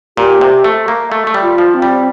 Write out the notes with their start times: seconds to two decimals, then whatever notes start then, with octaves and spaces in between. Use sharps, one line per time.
0.17 A#2 G4
0.41 C3
0.64 A3
0.88 A#3
1.12 A3
1.27 A3
1.34 G3
1.42 F4
1.58 F3
1.74 C4
1.82 G3